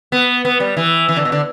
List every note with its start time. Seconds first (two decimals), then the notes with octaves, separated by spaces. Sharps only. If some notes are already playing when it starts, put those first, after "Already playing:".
0.12 B3
0.45 B3
0.60 G3
0.77 E3
1.09 E3
1.16 D3
1.25 B2
1.32 D3